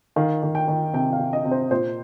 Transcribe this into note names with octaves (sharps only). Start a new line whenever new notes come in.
D#3 F5
D#3
G5
D#3
C3 G5
F5
C3
D#5
C3
C5
A#2 C5